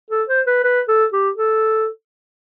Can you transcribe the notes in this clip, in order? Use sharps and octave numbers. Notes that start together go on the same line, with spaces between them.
A4
C5
B4
B4
A4
G4
A4